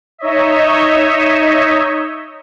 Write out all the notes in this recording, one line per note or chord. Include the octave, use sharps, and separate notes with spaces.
D#4 C#5 D#5 E5